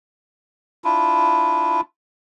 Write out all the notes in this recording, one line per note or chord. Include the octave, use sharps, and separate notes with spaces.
D4 E4 F4